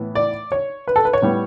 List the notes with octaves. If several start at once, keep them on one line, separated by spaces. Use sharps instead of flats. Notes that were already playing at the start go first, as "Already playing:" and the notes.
Already playing: A2 E3 B3
D5
C#5
B4
A4
B4
C#5
A2 G3 B3